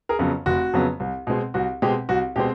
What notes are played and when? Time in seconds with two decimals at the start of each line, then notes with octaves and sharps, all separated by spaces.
0.09 G#4 A#4
0.19 F2 C#3 F#3 B3
0.46 F1 F#4
0.73 F2 C#3 F#3 B3
1.00 C2
1.27 B2 G#3 C4
1.54 C2 F#4
1.82 B2 G#3 C4 G4
2.09 C2 F#4
2.36 B2 G#3 C4 G4